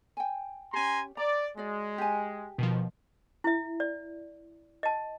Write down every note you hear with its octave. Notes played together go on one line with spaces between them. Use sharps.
G5 G#5
C#4 G4 G#5 A#5 C6
D5 A#5
G#3 F#4 D5
G4 G#5
B2 D#3 F3
E4 E5
D5
D#5 A5